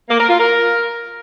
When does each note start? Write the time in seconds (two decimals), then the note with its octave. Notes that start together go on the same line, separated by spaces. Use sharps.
0.09 A#3
0.19 A#4
0.29 F4
0.39 A#4